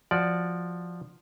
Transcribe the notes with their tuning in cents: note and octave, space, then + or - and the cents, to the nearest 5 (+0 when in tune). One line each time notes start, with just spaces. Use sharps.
F3 +0 F#4 +0 D5 +0